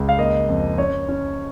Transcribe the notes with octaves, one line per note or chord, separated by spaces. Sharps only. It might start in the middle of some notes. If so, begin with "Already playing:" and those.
Already playing: C#2
F5
A#3 D#5
F2
C#4 C#5
C#4